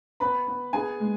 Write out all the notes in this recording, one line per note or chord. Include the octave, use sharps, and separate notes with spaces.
B3 B4 B5
B3
B3 G#4 G#5
G#3